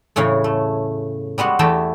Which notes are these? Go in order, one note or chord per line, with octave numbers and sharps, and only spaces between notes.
E2 A2 C#3 E3 C#4
A3
G3 G#3 B3 F#4
E2 E3 A3 G4 G5 A5